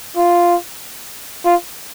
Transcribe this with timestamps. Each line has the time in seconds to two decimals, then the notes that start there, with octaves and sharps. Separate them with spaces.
0.17 F4
1.45 F4